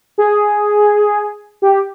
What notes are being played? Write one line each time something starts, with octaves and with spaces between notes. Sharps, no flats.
G#4
G4